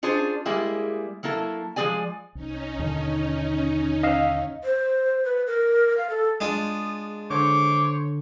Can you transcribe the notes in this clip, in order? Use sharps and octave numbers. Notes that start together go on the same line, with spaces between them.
C#4 D4 F4 G#4 C5
G3 G#3 A#3 E4 G#4
F#3 A#3 E4 A4
F3 G#3 C4 G#4 D5 G#5
C2 C#4 D#4
D#2 B2 D3
D#5 F5
C5
B4
A#4
F5
A4
G#3 D4 F4 G#4 D#6
D3 C5 C#5 D6